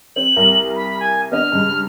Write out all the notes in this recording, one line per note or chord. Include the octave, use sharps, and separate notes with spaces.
C4 F#7
C2 A#4
B5
G#5
B3 D4 D#5 F6
G2 C#3 G#3